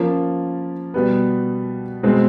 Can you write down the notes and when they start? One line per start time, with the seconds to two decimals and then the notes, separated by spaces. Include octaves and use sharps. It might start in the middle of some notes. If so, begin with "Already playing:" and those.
Already playing: F3 A#3 C#4 F4
0.94 B2 G3 B3
2.03 B2 G#3 C4